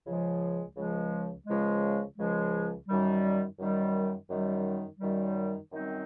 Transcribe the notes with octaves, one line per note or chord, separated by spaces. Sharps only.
C#2 C#3 F3 G#3
C#2 C#3 F3 G#3
C#2 C#3 F3 G#3
C#2 C#3 F3 G#3
F#2 D#3 G3
F#2 D#3 G3
F#2 D#3 G3
F#2 D#3 G3
F#2 D#3 G3 C4 D#4